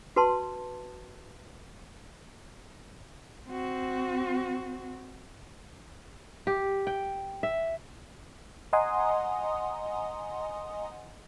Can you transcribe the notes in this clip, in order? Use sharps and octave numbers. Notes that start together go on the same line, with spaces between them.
F#4 B4 A5 C6
C4 F#4
G4
G5
E5
D#5 F#5 G#5 A#5 C6 D#6